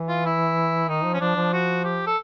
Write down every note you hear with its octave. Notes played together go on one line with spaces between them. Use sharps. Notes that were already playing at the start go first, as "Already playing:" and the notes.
Already playing: E3
F4
E4
D#3 D#4
F3
C#4
F3 D4
F3
F#4
G4
A4